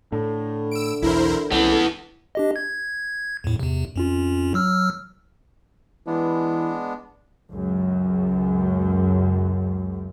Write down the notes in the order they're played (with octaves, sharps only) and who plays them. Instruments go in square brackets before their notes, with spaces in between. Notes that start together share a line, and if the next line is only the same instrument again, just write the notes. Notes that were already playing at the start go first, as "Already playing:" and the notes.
[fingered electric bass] A2 [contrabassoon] D3
[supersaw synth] E6 D7
[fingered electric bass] B1 E2 [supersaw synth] E4 A#4 C5
[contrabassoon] E1 [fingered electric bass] C2 C#4 [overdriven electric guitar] E3 B3 [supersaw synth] A4
[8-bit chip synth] D4 G4 D#5
G#6
E2 A2
E2 C3
F2 C#4 F4
F#3 E6 F6
[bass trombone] E3 [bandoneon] G#3 B3 D4
[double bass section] C#2 F#2